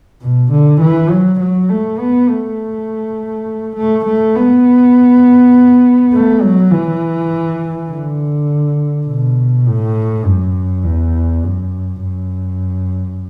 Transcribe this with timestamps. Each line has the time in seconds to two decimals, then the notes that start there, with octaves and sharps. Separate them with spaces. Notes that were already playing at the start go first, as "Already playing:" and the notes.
0.22 B2
0.51 D3
0.81 E3
1.10 F#3
1.40 F#3
1.69 A3
1.98 B3
2.28 A3
3.76 A3
4.05 A3
4.35 B3
6.12 A3
6.41 F#3
6.71 E3
7.89 D3
9.07 B2
9.66 A2
10.25 F#2
10.84 E2
11.43 F#2
12.02 F#2